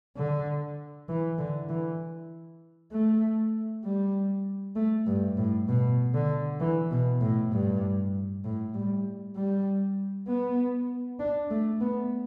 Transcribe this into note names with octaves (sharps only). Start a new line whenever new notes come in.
D3
E3
D3
E3
A3
G3
A3
G2
A2
B2
D3
E3
B2
A2
G2
A2
G3
G3
B3
D4
A3
B3